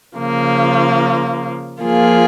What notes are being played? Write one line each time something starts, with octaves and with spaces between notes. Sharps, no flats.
C#3 F3 A#3
F3 A#3 F4 G#4